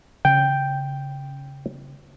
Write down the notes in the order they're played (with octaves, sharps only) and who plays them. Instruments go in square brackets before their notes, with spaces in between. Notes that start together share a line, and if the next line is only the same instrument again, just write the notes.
[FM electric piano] C#3 [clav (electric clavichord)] G5